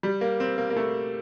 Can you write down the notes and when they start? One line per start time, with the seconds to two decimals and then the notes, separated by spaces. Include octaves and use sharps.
0.03 G3
0.21 A#3
0.40 C4
0.58 A#3
0.70 A#3
0.76 A3